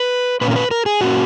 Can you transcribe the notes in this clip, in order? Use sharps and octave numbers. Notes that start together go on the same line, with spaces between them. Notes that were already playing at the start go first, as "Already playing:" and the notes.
Already playing: B4
A#2 A#3 C#4 B4
A#4
B4
A#4
G#4
A#2 A#3 C#4 F#4